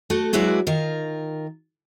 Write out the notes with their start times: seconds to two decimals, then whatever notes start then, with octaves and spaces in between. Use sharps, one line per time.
0.10 A3 F#4 A4
0.33 F#3 G#3 E4 F#4 B4 D5
0.67 D#3 F4 A#4